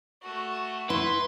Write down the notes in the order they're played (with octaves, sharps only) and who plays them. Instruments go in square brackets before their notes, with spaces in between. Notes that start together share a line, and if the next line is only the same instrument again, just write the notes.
[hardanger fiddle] A3 F#4
[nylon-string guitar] E4 [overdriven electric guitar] B4 [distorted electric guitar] C6